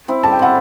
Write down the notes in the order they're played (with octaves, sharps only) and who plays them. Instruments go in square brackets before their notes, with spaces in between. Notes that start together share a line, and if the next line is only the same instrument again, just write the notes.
[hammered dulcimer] C4 E4
[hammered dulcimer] G3 [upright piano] A5
[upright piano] G5
[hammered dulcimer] C4 E4 [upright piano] F#5